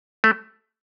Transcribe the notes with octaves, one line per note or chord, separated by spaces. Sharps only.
A3